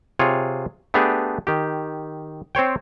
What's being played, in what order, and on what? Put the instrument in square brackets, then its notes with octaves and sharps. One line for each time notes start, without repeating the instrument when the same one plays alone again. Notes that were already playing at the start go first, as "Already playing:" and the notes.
[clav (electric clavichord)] C3 F4 G#4 C#5
A3 B3 D4 G4 G#4
D#3 G4
C4 C5 C#5 G5